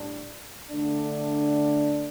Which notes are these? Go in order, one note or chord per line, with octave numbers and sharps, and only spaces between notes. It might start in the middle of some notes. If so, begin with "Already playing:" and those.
Already playing: A2 G3 D4
D3 A3 D4